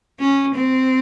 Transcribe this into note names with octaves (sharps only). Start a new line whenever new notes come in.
C#4
C4